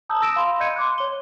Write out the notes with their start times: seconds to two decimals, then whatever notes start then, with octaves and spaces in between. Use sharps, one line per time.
0.09 A5 A#5 D#6 E6 G6
0.22 E6 A#6 D7 E7
0.36 F5 B5 C6
0.60 D#5 G6 G#6 C#7 D#7
0.76 C6 D6 F#6
0.98 C#5 G7